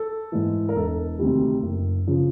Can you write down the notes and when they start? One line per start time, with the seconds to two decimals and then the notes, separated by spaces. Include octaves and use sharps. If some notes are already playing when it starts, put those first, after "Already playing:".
Already playing: A4
0.32 G#2 E3
0.69 A#4
0.76 E1 A4
1.19 D2 C3 D#3 G3
1.62 F#1
2.07 C#3 F3